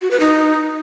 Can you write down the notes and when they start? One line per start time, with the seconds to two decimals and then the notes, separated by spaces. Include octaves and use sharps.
0.02 F#4
0.11 B4
0.20 D#4